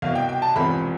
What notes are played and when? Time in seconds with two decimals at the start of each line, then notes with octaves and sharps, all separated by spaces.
0.02 C2 B2 F5
0.15 G5
0.29 G5
0.42 A5
0.56 E1 E2 C3 F3 B5